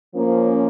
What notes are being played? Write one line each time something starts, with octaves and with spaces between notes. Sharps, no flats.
F3 A#3 C#4